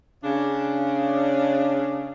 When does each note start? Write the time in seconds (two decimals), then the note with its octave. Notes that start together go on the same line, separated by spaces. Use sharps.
0.23 C#3 D4